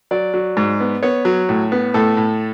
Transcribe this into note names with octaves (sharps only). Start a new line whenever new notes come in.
F#3 D5
F#3
G#2
B3
B3 C#5
F#3
A2
B3
A2 A4
A2